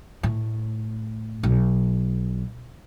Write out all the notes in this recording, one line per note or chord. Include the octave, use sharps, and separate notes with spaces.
A2
B1